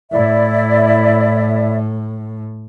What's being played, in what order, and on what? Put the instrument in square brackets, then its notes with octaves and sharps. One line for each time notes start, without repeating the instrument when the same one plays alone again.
[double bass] A2 [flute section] E4 D5 E5